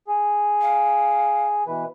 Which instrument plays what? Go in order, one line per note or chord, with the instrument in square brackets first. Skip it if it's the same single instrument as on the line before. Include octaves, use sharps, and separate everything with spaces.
[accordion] G#4
[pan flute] F5
[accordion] B2 E3 B4